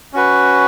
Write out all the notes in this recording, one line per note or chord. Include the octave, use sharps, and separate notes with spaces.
C#4 F#4 B4